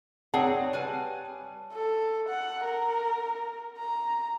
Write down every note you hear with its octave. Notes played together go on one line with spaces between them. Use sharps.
C4 G#4 C#5 D5 F#5 A5
G3 B4 G#5
A4
F#5
A#4
A#5